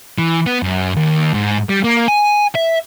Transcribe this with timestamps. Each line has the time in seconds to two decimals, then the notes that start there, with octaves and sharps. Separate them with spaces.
0.18 E3
0.46 B3
0.63 F#2
0.96 D#2
1.34 G#2
1.69 G3
1.84 A#3
2.08 G#5
2.55 E5